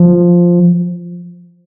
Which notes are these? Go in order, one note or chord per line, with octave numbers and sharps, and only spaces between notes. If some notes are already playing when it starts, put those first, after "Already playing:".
Already playing: F3